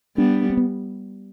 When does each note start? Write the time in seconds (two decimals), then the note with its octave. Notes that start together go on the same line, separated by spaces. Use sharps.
0.17 G3 B3 D4
0.50 C4
0.57 B3